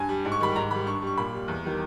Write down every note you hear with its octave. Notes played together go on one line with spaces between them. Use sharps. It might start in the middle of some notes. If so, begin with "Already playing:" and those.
Already playing: G2 G#5
G3
G#2
C#6
D#3 G3 B5
G#2 A#5
D#3 G3 B5
G2 C#6
G3
C#6
A#2 B5
G3
E2
D#3 G3